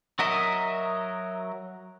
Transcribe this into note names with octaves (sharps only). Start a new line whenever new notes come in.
F#3 F#4 A#4 D#5 E5